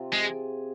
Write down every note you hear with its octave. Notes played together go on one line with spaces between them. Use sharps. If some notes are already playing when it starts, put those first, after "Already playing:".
Already playing: C3 F4
G#3 G#4